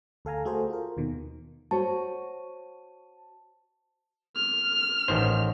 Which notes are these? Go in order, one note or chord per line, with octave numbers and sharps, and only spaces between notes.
D2 A4 F5 G#5 A#5
A3 F#4 G#4 A4 C5
F4 A#4
D#2 B2 D#3
F#4 C5 C#5 A5
F6
A1 D#3 C5